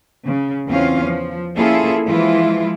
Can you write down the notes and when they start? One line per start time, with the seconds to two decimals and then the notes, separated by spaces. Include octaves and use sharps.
0.24 C#3
0.67 E2 C4 C#4 F4 F5
1.05 F3
1.56 A#3 C#4 E4 F4 G#4 A4
2.07 E3 F3 G#3 E4 F4